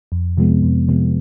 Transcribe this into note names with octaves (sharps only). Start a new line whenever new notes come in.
F2
C3 F3 G#3 B3
F2
C3 F3 G#3 B3